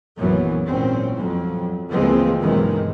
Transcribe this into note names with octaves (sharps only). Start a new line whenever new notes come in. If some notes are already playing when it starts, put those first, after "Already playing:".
A#1 F#2 E3 F#3 B3
G#1 A#2 C4 C#4
F2 F#3
C#2 E3 F3 G#3 A#3 C4
B1 G2 D#3 E3 G#3